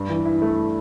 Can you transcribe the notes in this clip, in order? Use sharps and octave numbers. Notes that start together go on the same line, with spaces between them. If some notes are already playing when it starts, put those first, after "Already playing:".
Already playing: G2
E3
E4
A3